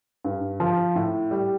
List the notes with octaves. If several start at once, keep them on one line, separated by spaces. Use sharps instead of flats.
G2
F3
A2
G3